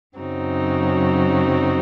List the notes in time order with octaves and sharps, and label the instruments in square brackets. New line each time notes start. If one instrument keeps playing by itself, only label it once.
[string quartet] F#2 C#3 F#3 C4 D#4